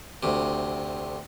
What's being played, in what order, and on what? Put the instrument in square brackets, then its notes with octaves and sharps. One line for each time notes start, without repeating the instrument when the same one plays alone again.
[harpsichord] D2 C3